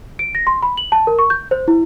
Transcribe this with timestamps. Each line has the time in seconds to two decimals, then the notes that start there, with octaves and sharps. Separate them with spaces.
0.19 D7
0.35 A#6
0.47 C6
0.63 B5
0.77 F#7
0.92 A5
1.07 A#4
1.19 C#6
1.30 G6
1.51 C5
1.68 E4